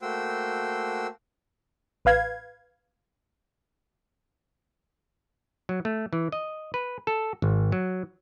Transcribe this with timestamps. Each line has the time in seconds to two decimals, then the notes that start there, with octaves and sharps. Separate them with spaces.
0.02 A3 A#3 F#4 C5 G5 E6
2.05 A1 B4 F5 G#6
5.69 F#3
5.85 A3
6.13 E3
6.32 D#5
6.74 B4
7.07 A4
7.42 G#1
7.72 F#3